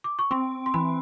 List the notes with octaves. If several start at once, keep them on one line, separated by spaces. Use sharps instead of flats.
D6
C#6
C4 C6
C6
E3 B5